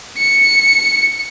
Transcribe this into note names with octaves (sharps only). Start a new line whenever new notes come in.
C#7